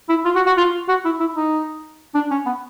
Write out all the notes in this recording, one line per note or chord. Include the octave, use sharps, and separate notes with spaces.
E4
F4
F#4
F#4
F4
F#4
E4
E4
D#4
D4
C#4
B3